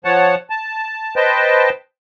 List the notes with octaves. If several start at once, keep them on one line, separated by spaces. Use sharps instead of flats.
F3 C#5 F#5 A5
A5
B4 C5 D#5 G5 A5